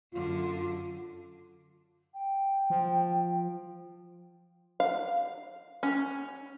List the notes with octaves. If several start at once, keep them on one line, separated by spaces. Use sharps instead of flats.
F#2 D3 F4
G5
F3
F5
C#4